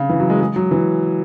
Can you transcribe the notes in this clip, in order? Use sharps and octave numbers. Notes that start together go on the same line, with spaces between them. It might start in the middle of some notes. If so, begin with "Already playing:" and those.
Already playing: C#3
E3
F#3
G#3
G#3
F#3
E3